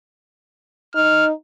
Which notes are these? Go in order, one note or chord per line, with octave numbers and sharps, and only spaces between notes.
D#4 F6